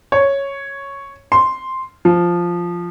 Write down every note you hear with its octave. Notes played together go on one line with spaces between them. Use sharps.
C#5
C6
F3